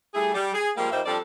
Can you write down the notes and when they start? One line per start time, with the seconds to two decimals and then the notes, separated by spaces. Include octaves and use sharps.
0.15 G3 A3 E4 G#4
0.34 G3
0.54 G#4
0.77 F3 G3 G#3 A#3
0.91 A#2 G3 A#3 D#4 C5 E5
1.06 F3 G3 C4 D4 A4 D5